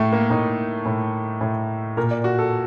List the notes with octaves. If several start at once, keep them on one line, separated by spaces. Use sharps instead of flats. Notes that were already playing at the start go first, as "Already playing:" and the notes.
Already playing: A2 A3
A#3
A2 D#4
A2
A2
A#2 A#4
D5
F#4
A4